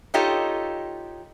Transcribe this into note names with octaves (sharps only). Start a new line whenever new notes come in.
D#4 F4 G4 A4 C#5 D#5